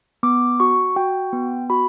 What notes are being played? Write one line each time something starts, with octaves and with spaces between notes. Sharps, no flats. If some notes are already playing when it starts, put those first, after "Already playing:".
B3 D6
F#4 C#6
F#4 G5
B3
F#4 B5